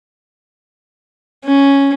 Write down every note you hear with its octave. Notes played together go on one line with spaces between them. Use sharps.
C#4